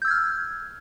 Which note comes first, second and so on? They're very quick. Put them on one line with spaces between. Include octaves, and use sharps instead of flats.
G6 E6 G#6 F6